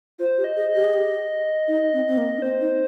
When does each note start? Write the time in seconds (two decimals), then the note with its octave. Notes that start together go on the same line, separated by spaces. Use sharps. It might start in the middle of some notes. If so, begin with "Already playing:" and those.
0.19 F4 C5
0.38 G4
0.44 D#5
0.56 G#4
0.68 D#5
0.75 G4
0.84 G#4
0.93 G4
1.68 D#4
1.93 C4
2.07 C4
2.17 A#3
2.37 D4
2.42 C4 C5
2.61 D#4